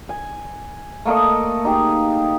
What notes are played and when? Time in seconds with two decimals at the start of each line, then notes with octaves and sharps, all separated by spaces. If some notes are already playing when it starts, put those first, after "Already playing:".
0.09 G#5
1.05 A3 A#3 A4 D#5
1.65 D#4 G4 G#4